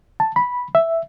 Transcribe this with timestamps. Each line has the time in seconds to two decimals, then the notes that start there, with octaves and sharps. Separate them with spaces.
0.20 A5
0.36 B5
0.75 E5